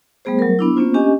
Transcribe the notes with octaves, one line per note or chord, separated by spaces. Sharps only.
G3 A3 B3 G#4 C5
F#3 A#4
B3 D4 E4
A#3 B3 C#4 F4 C5
C#4 D4 G4 D#5 G#5